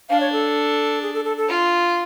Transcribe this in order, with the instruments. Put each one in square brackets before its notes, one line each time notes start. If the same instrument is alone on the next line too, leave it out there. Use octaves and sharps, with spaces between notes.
[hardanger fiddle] D4 [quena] F5
[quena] C#5
A4
G#4
A4
A4
A4
[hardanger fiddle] F4